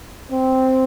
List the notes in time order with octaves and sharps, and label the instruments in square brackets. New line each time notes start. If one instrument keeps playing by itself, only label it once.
[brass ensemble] C4